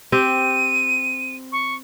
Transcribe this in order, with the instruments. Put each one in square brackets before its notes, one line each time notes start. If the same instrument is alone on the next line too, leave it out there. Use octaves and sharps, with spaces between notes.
[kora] C4 G4 [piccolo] D#7
[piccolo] C#6